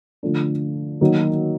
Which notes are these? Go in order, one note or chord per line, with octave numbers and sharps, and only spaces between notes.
D3 F3 A3 D4
D#3 F#3 A#3 D#4